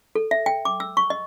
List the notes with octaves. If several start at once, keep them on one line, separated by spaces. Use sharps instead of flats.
A4
E5
G5
D6
E6
C#6
D#5